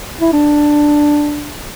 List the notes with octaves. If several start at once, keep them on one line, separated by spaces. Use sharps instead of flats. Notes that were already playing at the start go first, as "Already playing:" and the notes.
E4
D4